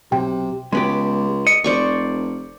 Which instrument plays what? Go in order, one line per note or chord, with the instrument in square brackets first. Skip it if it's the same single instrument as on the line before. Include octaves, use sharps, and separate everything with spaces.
[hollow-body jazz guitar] B1 [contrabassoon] C3 [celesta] G5
[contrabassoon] C#2 [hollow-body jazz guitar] G#3 B3 G4
[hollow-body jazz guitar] D#5 [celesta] C#7
[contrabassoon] F1 [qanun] C5 D5 C#6